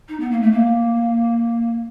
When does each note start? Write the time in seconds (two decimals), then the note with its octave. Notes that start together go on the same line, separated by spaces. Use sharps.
0.09 D#4
0.20 B3
0.31 A#3
0.42 A3
0.52 A#3